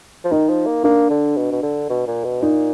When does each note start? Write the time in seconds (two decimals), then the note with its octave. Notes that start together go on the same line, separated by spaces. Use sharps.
0.24 F3
0.31 D#3 D#4
0.49 F3
0.66 A#3
0.83 A#3 D4
1.10 D3
1.37 B2
1.52 B2
1.63 D3
1.89 B2
2.07 A#2
2.24 B2
2.42 A#2 D#4